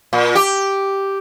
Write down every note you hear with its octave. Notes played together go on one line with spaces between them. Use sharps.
A#2
G4